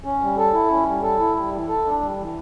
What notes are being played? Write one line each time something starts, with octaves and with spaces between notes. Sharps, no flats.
C#4
G3
A4
E4
C#4
G3
A4
E4
G3
E3
A4
D4
G3
E3